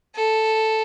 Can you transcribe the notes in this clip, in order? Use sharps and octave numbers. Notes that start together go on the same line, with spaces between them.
A4